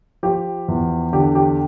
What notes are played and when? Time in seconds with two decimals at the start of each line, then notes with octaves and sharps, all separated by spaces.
0.23 F3 G4
0.68 E2
1.13 D3 G4
1.35 G4